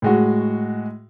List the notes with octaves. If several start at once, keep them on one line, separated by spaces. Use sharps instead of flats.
A2 G#3 F#4